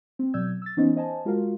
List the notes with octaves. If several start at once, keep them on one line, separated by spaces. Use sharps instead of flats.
C4
B2 F#3 D5 E6 G6 G#6
E6 A6
E3 B3 C#4 D#4 C5 D#5
C5 D#5 G#5 A5
G#3 F4 F#4 A#4 F5